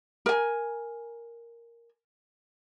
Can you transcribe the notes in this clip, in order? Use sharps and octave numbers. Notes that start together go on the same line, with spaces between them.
A#4 G#5